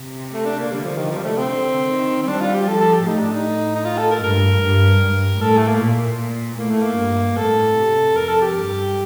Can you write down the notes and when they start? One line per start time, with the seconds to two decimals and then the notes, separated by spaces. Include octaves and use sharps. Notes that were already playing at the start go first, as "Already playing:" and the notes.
Already playing: C3
0.33 A3
0.45 D4
0.59 A#3
0.72 D3 G3
0.85 F3
0.98 D#3
1.10 C3 F3
1.17 G3
1.24 A3
1.37 C4
1.49 D3
1.89 D#3
2.23 C4
2.28 G3 D4
2.41 F4
2.54 G4
2.68 F3 A4
2.80 A4
2.93 G4
3.06 A2 D#4
3.19 D4
3.32 D#4
3.75 D#4
3.85 F4
3.98 A4
4.11 A#4
4.23 G2 A#4
4.64 G2
5.02 G2
5.41 A2 A4
5.58 A3
5.68 A#3
5.80 A#2
6.58 A2 A#3
6.70 A3
6.82 A#3
6.98 G2
7.37 A2 A4
7.76 C3
8.16 F2 A#4
8.28 A4
8.42 G4
8.54 G2